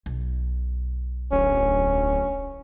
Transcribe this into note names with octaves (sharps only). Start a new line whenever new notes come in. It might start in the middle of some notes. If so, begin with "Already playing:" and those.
B1
D1 C#4